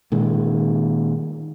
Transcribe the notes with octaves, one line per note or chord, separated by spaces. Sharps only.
A#2 D#3 G#3